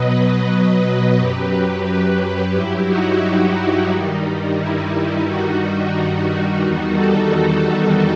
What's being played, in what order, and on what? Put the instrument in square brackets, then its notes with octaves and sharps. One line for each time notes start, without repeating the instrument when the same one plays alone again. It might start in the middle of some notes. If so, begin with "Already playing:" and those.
Already playing: [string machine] B2 F#3 B4 D#5
F#2 F#3 G4 B4
G2 F#3 E4 G4
D#4 F#4
D#4
G2 D#3 G3
E4
G2 D#3 G3 D#4 F#4
E2 D#3 G3 D#4 F#4
F#4 A4